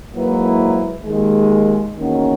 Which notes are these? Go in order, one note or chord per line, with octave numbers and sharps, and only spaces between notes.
G#2 F#3 A#3 E4 B4
D#2 D#3 G#3
E2 D#3 A#3 C#4 F#4